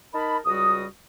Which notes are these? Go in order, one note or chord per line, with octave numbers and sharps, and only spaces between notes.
D#4 A#4 A5 B5
C#2 G3 F#4 D#6